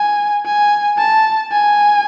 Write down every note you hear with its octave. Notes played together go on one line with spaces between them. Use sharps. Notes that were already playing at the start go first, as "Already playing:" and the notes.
Already playing: G#5
G#5
A5
G#5